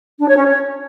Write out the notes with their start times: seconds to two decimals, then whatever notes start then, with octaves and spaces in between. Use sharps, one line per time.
0.19 D4
0.27 C#5
0.35 C#4
0.43 C#5